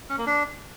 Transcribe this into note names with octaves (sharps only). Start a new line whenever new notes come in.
C#4
A#3
D4